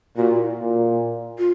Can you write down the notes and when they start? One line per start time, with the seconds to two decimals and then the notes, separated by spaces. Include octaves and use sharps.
0.16 A#2 F#4
0.31 E4
0.60 A#2
1.38 F4